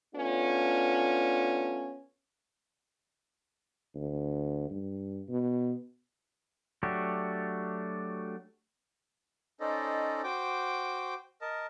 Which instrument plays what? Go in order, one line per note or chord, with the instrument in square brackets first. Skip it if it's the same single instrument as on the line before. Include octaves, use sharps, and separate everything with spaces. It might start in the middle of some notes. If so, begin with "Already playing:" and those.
[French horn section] A3 B3 C#4 D4 F4
[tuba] D2
G2
B2
[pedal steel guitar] F#3 A3 D4 F#4 G4
[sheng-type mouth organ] C#4 D#4 A4 C5 D5 D#5
F#4 C5 G5 D6
A#4 D#5 A5